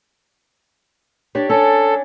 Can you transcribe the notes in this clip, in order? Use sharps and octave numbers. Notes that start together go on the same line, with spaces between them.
D4 G4 C#5
C#4 D4 A4